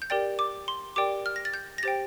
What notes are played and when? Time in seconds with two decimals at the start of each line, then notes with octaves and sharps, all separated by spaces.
0.02 G6
0.10 G4 A#4 D5 G5 A6
0.39 D6
0.68 C6
0.96 G4 A#4 D5 G5 D6
1.26 F6
1.36 A#6
1.45 A6
1.54 G6
1.78 A#6
1.83 G4 C5 G5 A6